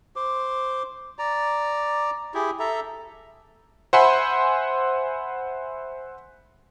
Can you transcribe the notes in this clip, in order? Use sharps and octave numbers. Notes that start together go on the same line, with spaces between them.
C5 D6
D5 A#5
E4 G4 G#4
A4 E5 A#5
C5 E5 F#5 G#5 B5 C6